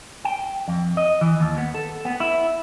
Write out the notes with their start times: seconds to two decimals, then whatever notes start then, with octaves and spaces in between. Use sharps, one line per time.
0.25 G5
0.68 F2
0.97 D#5
1.21 E3
1.40 D#2
1.58 B3
1.75 A4
2.05 B3
2.20 E4